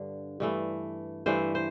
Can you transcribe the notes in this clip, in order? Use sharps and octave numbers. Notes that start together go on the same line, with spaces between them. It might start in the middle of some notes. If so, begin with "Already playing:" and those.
Already playing: G2 D3
G2 E3 A3
G2 E3 A3 C5
C5